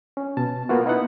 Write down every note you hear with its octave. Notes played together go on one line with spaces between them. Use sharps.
C#4
B2 A5
A#3 B3 F4 F#4
B3 D#4 E4 F#5